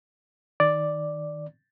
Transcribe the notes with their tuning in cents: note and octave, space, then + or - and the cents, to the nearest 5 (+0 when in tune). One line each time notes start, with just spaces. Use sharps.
D#3 +5 D5 +0